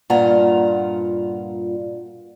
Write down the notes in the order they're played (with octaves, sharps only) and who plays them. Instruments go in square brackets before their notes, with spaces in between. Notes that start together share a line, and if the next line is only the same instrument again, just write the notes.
[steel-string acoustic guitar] G2 A#2 F4 F#5 A#5